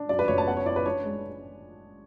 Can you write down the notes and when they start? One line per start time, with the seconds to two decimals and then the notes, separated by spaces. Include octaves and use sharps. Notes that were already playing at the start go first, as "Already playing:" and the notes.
Already playing: D4
0.09 F#2 D5
0.19 B4
0.28 F#1 C#5
0.38 A5
0.47 B3 F#5
0.57 C#5
0.66 E4 D5
0.76 B4
0.86 D4 C#5
1.04 G#3